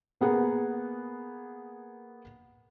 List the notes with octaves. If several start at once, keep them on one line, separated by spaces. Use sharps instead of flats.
A#3 B3 G#4 F#5 A#5